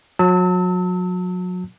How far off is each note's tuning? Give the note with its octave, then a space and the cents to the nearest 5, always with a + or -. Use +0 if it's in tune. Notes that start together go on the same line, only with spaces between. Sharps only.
F#3 -35 A5 +30 E6 -30